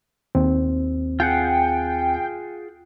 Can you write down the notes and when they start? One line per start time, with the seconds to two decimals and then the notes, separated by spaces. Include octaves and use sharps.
0.35 D#2 C4
1.20 F4 G#4 F#5 G5